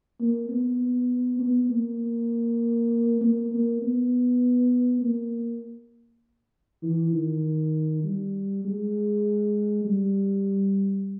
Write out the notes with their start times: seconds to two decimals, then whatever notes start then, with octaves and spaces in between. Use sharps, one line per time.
0.20 A#3
0.49 B3
1.39 B3
1.69 A#3
3.21 A#3
3.51 A#3
3.82 B3
5.02 A#3
6.82 E3
7.13 D#3
8.03 G3
8.65 G#3
9.85 G3